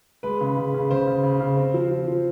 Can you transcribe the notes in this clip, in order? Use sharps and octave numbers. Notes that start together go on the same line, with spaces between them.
G#3 B4
C#3
C#3
C#3
C#3 C5
C#3
C#3
C#3
C4
F3
F3
F3